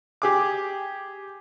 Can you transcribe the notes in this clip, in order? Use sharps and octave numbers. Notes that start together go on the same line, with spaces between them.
G4 G#4 D6